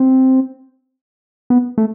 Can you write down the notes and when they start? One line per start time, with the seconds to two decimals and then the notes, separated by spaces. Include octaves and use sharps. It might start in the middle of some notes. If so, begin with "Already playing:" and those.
Already playing: C4
1.50 B3
1.78 A3